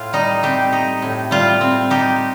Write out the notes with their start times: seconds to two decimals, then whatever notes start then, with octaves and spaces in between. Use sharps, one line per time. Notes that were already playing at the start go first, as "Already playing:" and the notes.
Already playing: A2 F4
0.13 G3 D#4
0.43 C4 G4
0.72 D#4
1.02 A2
1.31 G3 F4
1.61 C4
1.90 D#4 G4